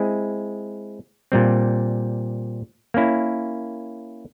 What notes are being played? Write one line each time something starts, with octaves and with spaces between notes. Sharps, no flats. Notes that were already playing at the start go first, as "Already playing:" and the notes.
Already playing: G#3 C4 E4 G#4
A#2 G3 C4
A#3 C#4 E4